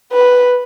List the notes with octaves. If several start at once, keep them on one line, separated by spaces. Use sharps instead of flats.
B4